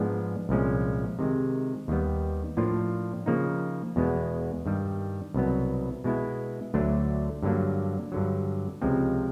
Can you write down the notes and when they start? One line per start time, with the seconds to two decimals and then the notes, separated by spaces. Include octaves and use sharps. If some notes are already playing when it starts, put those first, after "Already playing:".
Already playing: G#2 F3 G#3 B3 D4
0.49 C2 A#2 F3 G#3 C#4
1.19 C3 D#3 G#3
1.88 D#2 D#3 G3 B3
2.57 A2 F3 A#3 D4 F4
3.26 C#3 F3 A#3 D#4
3.96 E2 B2 G#3 B3
4.66 G2 D#3 G3
5.34 C2 B2 F#3 B3
6.04 B2 G#3 B3 E4
6.74 D2 D3 F#3 A3 D4
7.43 G2 D3 F#3 A#3 D4
8.12 G2 D3 F#3
8.82 C#2 C3 F3 G#3 C4